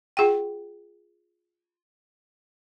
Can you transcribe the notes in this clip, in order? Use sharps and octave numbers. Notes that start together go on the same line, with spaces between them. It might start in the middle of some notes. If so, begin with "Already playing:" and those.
F4 G#4 F#5 G5